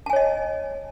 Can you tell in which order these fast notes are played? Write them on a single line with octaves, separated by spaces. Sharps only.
A5 G#5 C#5 D#5